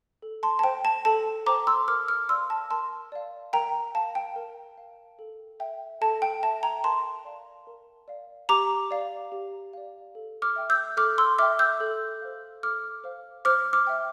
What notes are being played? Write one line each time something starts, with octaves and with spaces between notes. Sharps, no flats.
A4
A5 C6
A5
C5 G5
A5
A4 A5
C5 G5 A#5 D6
C6 E6
A#4 D6 F6
D6 F6
D5 F5 C6 E6
A5
A#4 A5 C6
D5 F5
A#4 G5 A#5
F5 A5
G5
A#4
F5
A4
E5 G5
A4 A5
G5
E5 G5 A5
G5 A#5
A#4 A5 C6
D5 F5
A#4
D5 F5
G4 A#5 D6
D5 F5
G4
D5 F5
A4
D6 F6
E5 G5
E6 G6
A4 D6 F6
C6 E6
E5 G5 D6 F6
E6 G6
A4
C5 F5
A4 D6 F6
C5 F5
C5 D6 F6
D6 F6
E5 G5